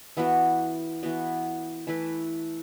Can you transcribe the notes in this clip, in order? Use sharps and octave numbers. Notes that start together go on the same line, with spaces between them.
E3 B3 F#4
E3 B3 F#4
E3 A3 E4 B4